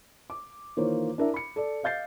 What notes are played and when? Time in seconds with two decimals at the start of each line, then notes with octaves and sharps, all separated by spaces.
0.30 D6
0.77 D#3 E3 A#3 F4 C5 C#5
1.18 D4 E4 A#4 E5
1.34 B5 C#7
1.56 A4 D5
1.83 D#5 F5 G6 A6 C7